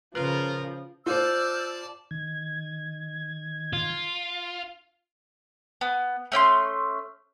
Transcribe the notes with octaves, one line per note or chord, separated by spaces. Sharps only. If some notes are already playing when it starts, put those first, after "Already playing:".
C#3 F3 F4 A#4 B4
F4 C5 D5 A5 E6 F6 G6
D#3 G#6
F4
B3
A3 C#4 G5 C6